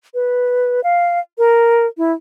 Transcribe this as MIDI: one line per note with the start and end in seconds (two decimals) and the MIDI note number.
0.14 0.80 71
0.84 1.19 77
1.38 1.86 70
1.97 2.12 64